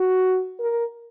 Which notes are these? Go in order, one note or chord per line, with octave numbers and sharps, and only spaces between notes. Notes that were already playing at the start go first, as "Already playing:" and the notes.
Already playing: F#4
A#4